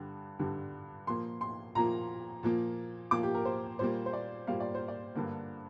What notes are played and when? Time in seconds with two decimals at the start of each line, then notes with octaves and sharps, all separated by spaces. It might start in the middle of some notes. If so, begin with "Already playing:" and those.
Already playing: G2 D3 G3
0.39 G2 D3 G3
1.07 A#2 F3 A#3 C6
1.41 C6
1.75 A#2 F3 A#3 A#5
2.43 A#2 F3 A#3
3.11 A#2 F3 A#3 D6
3.23 G4
3.35 A#4
3.45 C5
3.79 A#2 G3 A#3 C5
4.06 C5
4.13 D5
4.47 A#2 G3 A#3 F5
4.60 D5
4.75 C5
4.88 D5
5.15 G2 D3 A#3